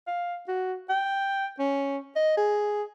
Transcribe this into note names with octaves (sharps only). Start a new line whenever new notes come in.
F5
F#4
G5
C#4
D#5
G#4